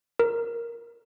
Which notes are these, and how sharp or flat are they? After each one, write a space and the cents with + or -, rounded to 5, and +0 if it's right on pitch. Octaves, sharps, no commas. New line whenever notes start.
A#4 +5